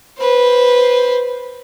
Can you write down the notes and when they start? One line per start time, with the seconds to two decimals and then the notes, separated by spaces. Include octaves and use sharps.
0.19 B4 C5